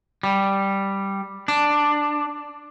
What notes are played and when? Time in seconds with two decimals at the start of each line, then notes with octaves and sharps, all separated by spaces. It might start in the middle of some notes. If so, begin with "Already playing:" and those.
0.23 G3
1.48 D4